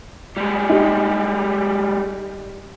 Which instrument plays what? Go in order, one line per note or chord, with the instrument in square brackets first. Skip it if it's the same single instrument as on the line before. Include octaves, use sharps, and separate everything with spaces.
[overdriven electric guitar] G3 G#3
[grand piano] D#4 G4